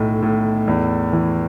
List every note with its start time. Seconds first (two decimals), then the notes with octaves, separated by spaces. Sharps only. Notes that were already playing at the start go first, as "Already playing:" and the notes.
Already playing: B1 A2 A3
0.22 A2
0.68 E2
1.13 E3